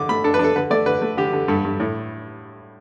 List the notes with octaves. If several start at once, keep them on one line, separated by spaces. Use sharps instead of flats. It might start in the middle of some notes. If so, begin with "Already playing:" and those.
Already playing: D3 D6
A3 B5
D4 A4
B4
D4
A4
D3 B4
A3 D5
D3 B4
A3
D3 G4
D3
G2 A4
G2
A2